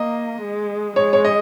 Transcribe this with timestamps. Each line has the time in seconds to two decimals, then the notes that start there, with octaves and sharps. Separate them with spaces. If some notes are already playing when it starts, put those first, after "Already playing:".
Already playing: A#3 D#5
0.42 G#3
0.96 G#3 C#5
1.13 C#5
1.25 D#5